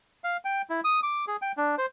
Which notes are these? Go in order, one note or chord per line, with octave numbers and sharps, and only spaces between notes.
F5
G5
E4
D#6
D6
G#4
G5
D4
C5